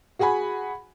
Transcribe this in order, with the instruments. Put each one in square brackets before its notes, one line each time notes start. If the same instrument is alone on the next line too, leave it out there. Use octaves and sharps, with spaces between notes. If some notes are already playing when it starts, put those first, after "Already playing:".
[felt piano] F#4 G#4 F#5 G#5 B5